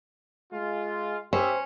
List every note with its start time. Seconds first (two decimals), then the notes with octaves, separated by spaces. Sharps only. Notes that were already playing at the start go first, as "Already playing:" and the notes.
0.52 G#3 F4
1.33 C#4 G4 C5 E5